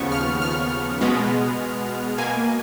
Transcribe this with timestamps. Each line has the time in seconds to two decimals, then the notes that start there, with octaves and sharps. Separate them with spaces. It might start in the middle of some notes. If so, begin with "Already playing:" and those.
Already playing: D#2 C#3 F3 B3 C#6
0.12 F6
0.42 F6
1.01 B2 G#3 B3
2.18 B2 A#3 G#5